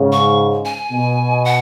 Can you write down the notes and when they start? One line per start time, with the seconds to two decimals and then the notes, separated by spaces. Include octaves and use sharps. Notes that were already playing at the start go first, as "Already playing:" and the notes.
Already playing: G#2 C#3
0.12 C#6
0.65 G#5
0.91 B2
1.45 F#5